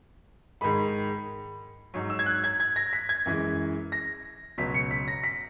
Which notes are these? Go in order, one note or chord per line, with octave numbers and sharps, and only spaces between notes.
G#2 D#3 G#3 B5
G#2 F#3
E6
G#6
F#6
G#6
G#6
A#6
B6
G#6
F#2 E3 G#3
A#6
C#2 B2 F#3 B6
C#7
B6
A#6
B6